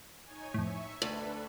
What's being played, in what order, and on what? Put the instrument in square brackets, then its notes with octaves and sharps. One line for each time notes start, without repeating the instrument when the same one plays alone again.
[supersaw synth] D#4 C#5 G#5
[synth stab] F2 A2 [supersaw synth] E5 C#6
[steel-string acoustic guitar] D2 [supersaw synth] D4 A4 B4